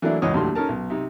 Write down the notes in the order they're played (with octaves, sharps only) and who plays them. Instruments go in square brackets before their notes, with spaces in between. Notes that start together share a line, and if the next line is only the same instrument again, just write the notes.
[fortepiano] E3 F#3 A3 A#3 D4 E4
C#2 F#2 E3 C#5 D#5 D#6
D#2 A2 D3 F#3 C6
C#4 D#4 A4 A#4 A5
B1
C3 D#4